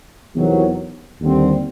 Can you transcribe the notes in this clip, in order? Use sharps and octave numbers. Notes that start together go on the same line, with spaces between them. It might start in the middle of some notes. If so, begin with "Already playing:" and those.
E2 C3 D#3 F#3
D#2 D3 G3 C4